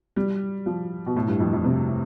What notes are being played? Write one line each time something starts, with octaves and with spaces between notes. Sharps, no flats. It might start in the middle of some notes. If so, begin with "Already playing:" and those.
G3
F3
B2
A2
G2
F2
F2
C3